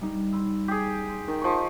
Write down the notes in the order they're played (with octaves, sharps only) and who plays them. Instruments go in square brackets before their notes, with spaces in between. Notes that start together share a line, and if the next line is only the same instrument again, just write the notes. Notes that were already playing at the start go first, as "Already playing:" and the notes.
[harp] G3 D#4
B5 C6 E6
[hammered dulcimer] G4 G#4
[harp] C6
[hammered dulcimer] D#3
F3 C#6